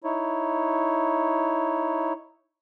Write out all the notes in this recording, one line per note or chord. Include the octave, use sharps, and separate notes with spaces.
D#4 E4 C#5